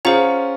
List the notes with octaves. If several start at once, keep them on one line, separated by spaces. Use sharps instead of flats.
C#4 F4 G#4 C5 F#5 A#5